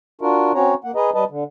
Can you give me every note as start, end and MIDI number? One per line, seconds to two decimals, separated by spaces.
0.21 0.52 62
0.21 0.52 65
0.21 0.52 66
0.21 0.52 70
0.54 0.74 60
0.54 0.74 61
0.54 0.74 66
0.54 0.74 73
0.54 0.74 82
0.84 0.92 58
0.84 0.92 78
0.95 1.10 68
0.95 1.10 71
0.95 1.10 75
0.95 1.10 82
1.14 1.24 55
1.14 1.24 71
1.14 1.24 75
1.14 1.24 81
1.30 1.44 50